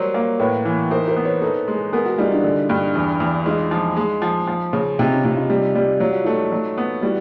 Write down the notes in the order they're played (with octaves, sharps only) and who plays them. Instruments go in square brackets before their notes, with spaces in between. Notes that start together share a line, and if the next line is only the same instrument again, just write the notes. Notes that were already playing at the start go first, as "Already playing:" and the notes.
Already playing: [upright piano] F#3 G3 [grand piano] A#4 C5
[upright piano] A#3
[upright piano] A2 [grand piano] B4 C#5
[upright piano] E3
[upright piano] D#4 [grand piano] A#4 C5
[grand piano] A#4 C5
[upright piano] B3
[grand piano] B4 C#5
[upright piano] D#4 [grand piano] A4 B4
[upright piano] G#3
[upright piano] B3 [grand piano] G#4 A#4
[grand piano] F#4 G#4
[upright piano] G3 [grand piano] D#4 F4
[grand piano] D4 E4
[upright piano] D3
G2
E2
E2
[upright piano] G#3 [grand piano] D#4 F4
[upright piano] F3
G#3
F3
F3
C#3
[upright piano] C3 [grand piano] D#4 F4
[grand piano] C#4 D#4
[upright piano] C3 [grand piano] D#4 F4
[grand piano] D#4 F4
[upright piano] G3
G3
[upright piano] F#3 [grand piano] F4
[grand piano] F#4
[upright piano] A3 [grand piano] D#4 F4
[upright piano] F#3
B3
[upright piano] G3 [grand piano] E4 F#4